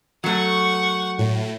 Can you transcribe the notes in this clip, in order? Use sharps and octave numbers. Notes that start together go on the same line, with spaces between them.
F#3 A3 F#5 C#6
A2